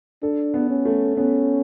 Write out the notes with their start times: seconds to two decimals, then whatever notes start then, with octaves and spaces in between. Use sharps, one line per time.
0.22 D4 A4
0.54 B3
0.70 C#4
0.85 A3
1.17 B3 C#4